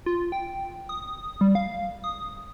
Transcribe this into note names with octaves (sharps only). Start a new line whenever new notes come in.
F4
G5
D#6
G3
F5
D#6